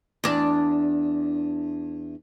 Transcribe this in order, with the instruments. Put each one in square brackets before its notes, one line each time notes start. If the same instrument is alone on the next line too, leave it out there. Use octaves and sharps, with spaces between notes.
[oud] E2 D4